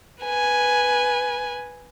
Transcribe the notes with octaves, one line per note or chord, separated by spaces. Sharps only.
B4 G#5